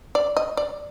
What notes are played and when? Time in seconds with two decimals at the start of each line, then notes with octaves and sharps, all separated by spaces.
0.15 D5
0.37 D#5
0.57 D5